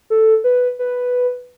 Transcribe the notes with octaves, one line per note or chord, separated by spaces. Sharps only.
A4
B4
B4